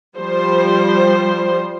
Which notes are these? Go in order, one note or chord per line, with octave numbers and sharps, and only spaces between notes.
F3 G3 C5